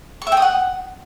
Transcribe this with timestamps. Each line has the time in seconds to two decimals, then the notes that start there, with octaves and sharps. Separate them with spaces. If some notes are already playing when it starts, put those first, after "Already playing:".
0.22 C#6
0.27 E5
0.32 G5
0.37 D#6
0.42 F#5